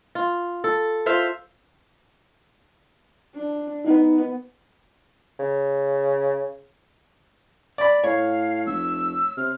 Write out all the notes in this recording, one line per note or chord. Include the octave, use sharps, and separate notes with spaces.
F4
A4
F4 C5 E5 F5
D4
B3 D#4
C#3
D5 B5
A2 C#5 F5
F1 E6
C3 F6